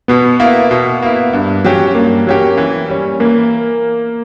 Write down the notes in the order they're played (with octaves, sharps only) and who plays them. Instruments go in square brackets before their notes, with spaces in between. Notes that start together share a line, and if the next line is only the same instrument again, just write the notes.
[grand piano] B2 [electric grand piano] B3
[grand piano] A#3 E4
B2
A#3 E4
G2
F#3 C#4 G4
[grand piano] G2 [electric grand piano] A#3
[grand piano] F#3 C#4 G4
E3
G3 C#4
[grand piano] E3 [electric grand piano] A#3